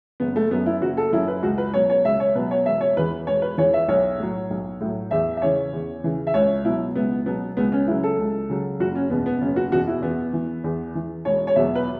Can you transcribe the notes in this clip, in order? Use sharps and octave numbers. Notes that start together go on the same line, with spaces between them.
F#1 B3
A3
F#2 F#3 B3
E4
F#1 F#4
A4
F#2 F#3 E4
B4
C#2 F#4
B4
B2 F#3 C#5
C#5
C#2 E5
C#5
B2 F#3 B4
C#5
E1 E5
C#5
E2 E3 B4
E1 C#5
B4
E2 E3 C#5
E5
B1 C#5
A2 F#3
B1
A2 F#3
E2 E5
E5
C#3 E3 C#5
E2
C#3 E3
E5
C#2 C#5
B2 F#3 E4
C#2 B3
B2 F#3 B3
C#2 B3
C#4
C#3 F#3 E4
A4
C#2
C#3 F#3
F#1 F#4
C#4
E2 B2 B3
B3
F#1 C#4
F#4
E2 B2 F#4
E4
E2 B3
E3
E2
E3
E1 C#5
C#5
E2 B2 F#3 E5
B4